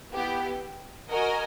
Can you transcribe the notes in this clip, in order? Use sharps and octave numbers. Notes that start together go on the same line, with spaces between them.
B3 E4 G4
F#4 A#4 D#5 G#5